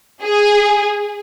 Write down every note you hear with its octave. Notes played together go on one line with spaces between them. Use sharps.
G#4